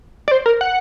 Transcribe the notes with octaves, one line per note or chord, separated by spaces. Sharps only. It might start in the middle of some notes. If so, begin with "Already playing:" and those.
D5
C5
A#4
F#5